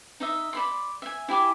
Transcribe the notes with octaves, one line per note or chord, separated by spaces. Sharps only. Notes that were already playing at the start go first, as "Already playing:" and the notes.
D#4 D#5 E5
D5 B5 C6
E5 G#5
E4 G4 G#5 D6